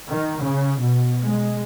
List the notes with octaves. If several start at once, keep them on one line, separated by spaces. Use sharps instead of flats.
D#3
C#3
B2
G#3